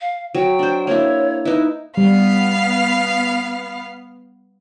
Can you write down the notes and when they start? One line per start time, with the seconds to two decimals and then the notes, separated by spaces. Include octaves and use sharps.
0.01 F5
0.35 F#3 G5
0.59 D4 C5
0.87 A#3 D4 E4 C#5
1.45 D#4 E4 B4
1.97 G3 B3 F5